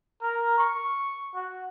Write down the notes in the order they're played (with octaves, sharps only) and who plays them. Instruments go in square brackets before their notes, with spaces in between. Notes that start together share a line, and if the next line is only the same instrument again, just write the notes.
[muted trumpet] A#4
C#6
F#4